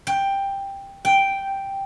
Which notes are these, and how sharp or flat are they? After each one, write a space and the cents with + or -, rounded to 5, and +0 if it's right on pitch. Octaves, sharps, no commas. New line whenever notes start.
G5 +10
G5 +0